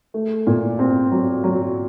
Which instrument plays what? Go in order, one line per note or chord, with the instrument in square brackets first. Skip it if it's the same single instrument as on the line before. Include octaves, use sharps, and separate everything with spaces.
[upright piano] A3
A#2
C4
F#3
F#3